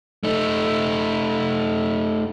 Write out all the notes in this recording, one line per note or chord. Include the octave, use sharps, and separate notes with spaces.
A3 D#4